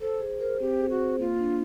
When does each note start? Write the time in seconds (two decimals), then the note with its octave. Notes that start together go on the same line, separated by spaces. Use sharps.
0.01 A4 C5
0.20 G#4
0.40 A#4 C5
0.60 C4 G4
0.79 G#4
0.90 F#4
1.00 C5
1.19 A#3 F4
1.39 D4